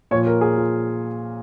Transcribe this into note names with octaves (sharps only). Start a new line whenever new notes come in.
A#2 F3 C#5
A#4
G#4
F4